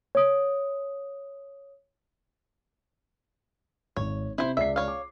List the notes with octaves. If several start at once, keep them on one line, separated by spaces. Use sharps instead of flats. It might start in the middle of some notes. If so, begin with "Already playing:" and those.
C#5 D#6
G#1 C#5
C3 E4 C5
C#2 D5 E5 C7
C#5 F5
D6